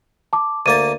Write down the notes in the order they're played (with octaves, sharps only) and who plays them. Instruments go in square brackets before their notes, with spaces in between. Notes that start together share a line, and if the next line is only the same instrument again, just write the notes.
[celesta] A5 D6
[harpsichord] D2 A#3 A5 [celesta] D#7